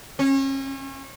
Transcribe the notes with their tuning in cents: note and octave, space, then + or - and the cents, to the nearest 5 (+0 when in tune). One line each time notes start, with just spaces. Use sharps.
C#4 -35